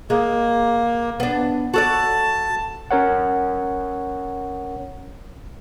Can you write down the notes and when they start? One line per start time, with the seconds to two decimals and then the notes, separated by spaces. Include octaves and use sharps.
0.10 G#3 A#3
1.20 B3 D4
1.74 F#4 A4 D5 A5
2.91 C#4 A#4 C#5 F#5